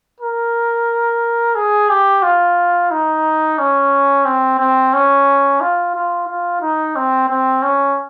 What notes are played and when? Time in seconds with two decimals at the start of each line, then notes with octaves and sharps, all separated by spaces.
0.20 A#4
1.56 G#4
1.90 G4
2.23 F4
2.91 D#4
3.58 C#4
4.25 C4
4.59 C4
4.93 C#4
5.61 F4
5.95 F4
6.28 F4
6.62 D#4
6.96 C4
7.29 C4
7.62 C#4